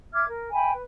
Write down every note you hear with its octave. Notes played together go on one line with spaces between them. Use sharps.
E5 D6 F6 G#6
A#4
E5 G5 G#5 B5
B4